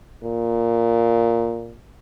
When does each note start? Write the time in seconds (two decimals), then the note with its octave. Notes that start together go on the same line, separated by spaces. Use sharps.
0.23 A#2